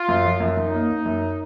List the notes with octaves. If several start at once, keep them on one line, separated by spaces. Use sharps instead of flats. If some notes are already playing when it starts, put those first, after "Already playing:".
Already playing: F4
F#2
F3
F#2
F#2 D#4
A#3
A#3
F#2